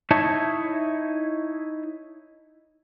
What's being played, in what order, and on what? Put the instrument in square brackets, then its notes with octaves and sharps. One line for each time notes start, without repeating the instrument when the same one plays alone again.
[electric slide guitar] D#4 E4 C#5 A5